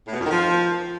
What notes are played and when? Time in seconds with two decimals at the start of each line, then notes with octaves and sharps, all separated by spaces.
0.06 A2
0.13 B2
0.19 F2
0.25 D#3
0.31 F3